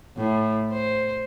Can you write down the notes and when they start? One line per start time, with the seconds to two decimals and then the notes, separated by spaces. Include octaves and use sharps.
0.17 A2
0.73 C5